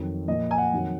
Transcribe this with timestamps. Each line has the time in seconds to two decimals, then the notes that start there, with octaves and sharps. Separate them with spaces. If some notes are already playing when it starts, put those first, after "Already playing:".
Already playing: F2 D#3 F#3
0.28 A#2 F3 D#5
0.51 G#5
0.58 F#5
0.73 F2 D#3 F#3